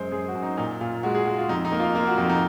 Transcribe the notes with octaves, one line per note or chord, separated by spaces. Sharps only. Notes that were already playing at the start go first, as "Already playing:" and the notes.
Already playing: F#2 G#3 C5
F#2 G#4
F#4
F#2
D#4
A#2 D#4
A#2 F4
G#3 F#4
G#4
G#3 F#4
F4
F2 D#4
D#4
A#3
F4
A#3 F4
F#4
F2 D#4
D#4